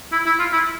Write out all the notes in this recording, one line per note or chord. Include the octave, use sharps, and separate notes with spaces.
E4
E4
F4
E4